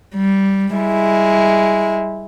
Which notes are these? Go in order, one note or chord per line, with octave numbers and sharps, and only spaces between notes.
G3
G3 G#3 E4